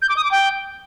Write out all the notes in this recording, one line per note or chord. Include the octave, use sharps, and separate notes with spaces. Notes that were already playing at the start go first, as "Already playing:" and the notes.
G6
D6
D#6
D6
G5